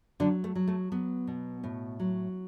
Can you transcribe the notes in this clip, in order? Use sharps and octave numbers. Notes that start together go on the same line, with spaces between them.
D3 F#3 D4
A3
F#3
A3
F#3 B3
B2
A2
F#3